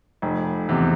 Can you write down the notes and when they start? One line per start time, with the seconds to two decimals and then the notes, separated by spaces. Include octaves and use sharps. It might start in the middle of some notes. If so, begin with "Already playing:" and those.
0.22 F1
0.69 E2 C3